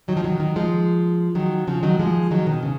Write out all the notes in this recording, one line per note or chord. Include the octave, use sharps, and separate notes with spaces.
D#3 F#3
F3
D#3 F#3
D#3 F#3
F3 G#3
D#3 F#3
C#3 F3
D#3 F#3
F3 G#3
D#3 F#3
B2 D#3
C#3